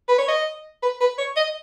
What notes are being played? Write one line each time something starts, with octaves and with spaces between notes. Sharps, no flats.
B4
C#5
D#5
B4
B4
C#5
D#5